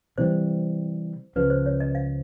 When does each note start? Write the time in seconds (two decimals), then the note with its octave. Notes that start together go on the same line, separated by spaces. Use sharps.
0.18 C3 E3 G3 C5
1.36 C#2 C#3 F3 B4
1.50 C5
1.66 C#5
1.80 D#5
1.95 F5